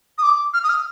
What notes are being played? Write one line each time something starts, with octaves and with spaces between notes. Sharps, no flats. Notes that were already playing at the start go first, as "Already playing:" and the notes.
D#6
D6
F6
D#6
F6